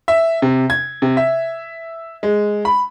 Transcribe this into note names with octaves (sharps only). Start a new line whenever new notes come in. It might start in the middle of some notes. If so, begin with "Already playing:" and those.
E5
C3
G#6
C3
E5
G#3
B5